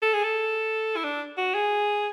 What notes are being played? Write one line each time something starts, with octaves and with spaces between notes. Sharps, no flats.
A4
G#4
A4
E4
D4
F#4
G#4